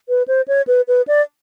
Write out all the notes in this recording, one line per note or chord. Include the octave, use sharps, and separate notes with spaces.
B4
C5
C#5
B4
B4
D5